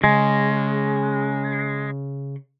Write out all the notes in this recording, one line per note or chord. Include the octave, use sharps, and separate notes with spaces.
C#3 G#3